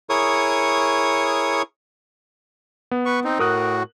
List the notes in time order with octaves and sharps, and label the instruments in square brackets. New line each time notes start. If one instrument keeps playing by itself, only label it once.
[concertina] E4 G#4 A#4 C#5 C#6 D#6
[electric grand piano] B3
[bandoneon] B4 C#6
C4 D#4
[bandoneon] A2 F#4 [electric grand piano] A#4 D#6 F#6